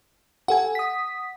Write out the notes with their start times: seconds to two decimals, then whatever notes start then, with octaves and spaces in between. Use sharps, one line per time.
0.48 G4 A4 F#5 G#5
0.75 D#6 B6